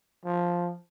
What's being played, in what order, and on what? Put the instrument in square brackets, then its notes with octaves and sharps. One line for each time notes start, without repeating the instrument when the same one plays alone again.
[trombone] F3